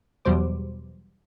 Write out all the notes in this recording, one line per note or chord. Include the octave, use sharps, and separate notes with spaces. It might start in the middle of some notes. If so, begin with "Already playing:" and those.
E2 B2 F#3 G3 C5 D6